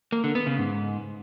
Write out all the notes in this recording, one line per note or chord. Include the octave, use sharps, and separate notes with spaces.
A#3
D3
B3
C#3
G#2